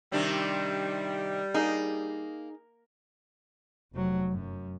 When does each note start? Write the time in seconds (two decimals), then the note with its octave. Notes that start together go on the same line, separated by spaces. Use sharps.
0.12 C3 D#3 G3 D4
1.54 A#3 D#4 G#4
3.94 F1 F#3
4.30 F#2